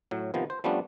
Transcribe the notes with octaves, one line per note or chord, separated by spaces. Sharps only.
A2 F#3
C3 D#3 F3 B3
C5
F3 G3 A3 B3 C#4 D4